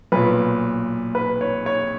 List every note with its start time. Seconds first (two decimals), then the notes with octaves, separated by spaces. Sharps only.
0.12 B1 A#2 B4
1.15 B4
1.41 C#5
1.66 C#5